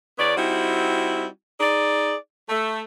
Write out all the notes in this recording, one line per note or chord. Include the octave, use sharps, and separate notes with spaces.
E2 B3 C#5 D5
G3 C4 D#4 E4 F#4
D#4 G#4 D5
A3